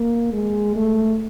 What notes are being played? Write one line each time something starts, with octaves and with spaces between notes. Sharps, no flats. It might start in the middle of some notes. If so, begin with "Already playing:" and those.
Already playing: A#3
G#3
A3